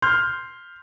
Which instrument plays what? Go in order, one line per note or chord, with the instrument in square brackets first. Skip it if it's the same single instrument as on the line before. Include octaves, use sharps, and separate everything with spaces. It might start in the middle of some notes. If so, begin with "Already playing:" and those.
[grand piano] C6 F6 G6